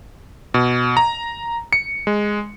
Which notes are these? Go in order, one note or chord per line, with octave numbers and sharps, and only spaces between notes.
B2
A#5
C#7
G#3